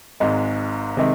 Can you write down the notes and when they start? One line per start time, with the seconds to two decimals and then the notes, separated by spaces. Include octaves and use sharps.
0.20 G#1 G#2 G#3 D#4
0.97 C3 D#3 G#3